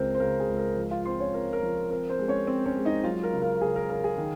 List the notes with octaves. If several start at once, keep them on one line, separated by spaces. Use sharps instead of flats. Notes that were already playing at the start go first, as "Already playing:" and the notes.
Already playing: C#2 C#3 C4 A#4 C5
C5
C#3 A#4
G#4
C#2
A#4
F3
F4 F5
C4 C5 C6
C#4 C#5
C4 A#4
A#4
F3
C4 A#4
C4 C5
G#3
C#4 C#5
C4 C5
C#4 C#5
G#3
D#4 D#5
F#3 F4 F5
A#4
C#3
A#4
C#3 G#4
A#4
C#3 A#4
G#4
D#3